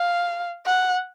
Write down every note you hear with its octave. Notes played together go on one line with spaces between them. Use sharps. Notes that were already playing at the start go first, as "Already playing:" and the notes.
Already playing: F5
F#5